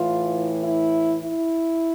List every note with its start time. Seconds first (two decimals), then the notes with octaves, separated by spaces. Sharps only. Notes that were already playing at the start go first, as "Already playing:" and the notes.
Already playing: A2 E3 F4
0.63 E4
1.23 E4